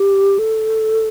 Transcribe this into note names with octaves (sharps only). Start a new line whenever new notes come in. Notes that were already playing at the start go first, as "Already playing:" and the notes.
Already playing: G4
A4